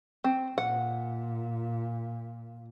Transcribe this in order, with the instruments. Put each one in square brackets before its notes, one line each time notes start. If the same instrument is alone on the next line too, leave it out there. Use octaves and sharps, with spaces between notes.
[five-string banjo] C4
[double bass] A#2 [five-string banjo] F#5